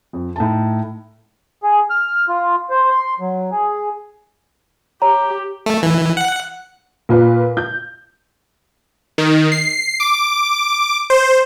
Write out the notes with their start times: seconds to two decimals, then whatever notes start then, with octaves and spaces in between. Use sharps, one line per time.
0.13 F2
0.36 A2 D#4 A5
1.63 G#4
1.90 F6
2.29 F4
2.70 C5
2.90 C6
3.20 F#3
3.52 G#4
5.02 G4 C#5 A#5
5.66 A3
5.83 E3
6.17 F#5
7.09 A#2 F4 B4
7.57 G6
9.18 D#3
9.52 C7
10.00 D6
11.10 C5